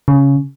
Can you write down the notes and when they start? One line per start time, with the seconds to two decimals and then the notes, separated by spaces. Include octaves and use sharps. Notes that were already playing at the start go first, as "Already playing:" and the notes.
0.08 C#3